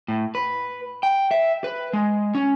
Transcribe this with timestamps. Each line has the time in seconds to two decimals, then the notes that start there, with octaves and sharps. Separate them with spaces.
0.08 A2
0.35 B4
1.03 G5
1.31 E5
1.64 B4
1.93 G#3
2.35 C#4